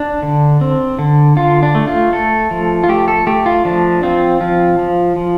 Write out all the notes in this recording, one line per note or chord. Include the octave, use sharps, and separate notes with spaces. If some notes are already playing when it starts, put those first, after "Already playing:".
Already playing: D4
D3
C4
D3
D3 F4
D4
A3
F4
A3 A4
F3
F4
A3 G4
A4
A3 G4
F4
F3 D4
C4 F4
F3 F4
F3
F3